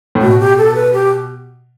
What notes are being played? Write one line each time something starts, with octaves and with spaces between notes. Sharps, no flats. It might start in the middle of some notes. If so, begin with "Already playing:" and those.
A2
B2 F#4
G4
A4
B4
G4